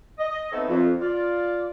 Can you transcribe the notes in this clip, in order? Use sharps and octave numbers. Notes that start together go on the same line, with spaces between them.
D#5
A3 B3 C4 D#4 A4 C#5
F2
F4 D5